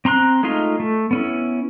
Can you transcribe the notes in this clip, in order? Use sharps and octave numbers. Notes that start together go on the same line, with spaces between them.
C4 A#5 C6 F#6
G#3 A3 D#4 F4 F5
A3
B3 C#4 E4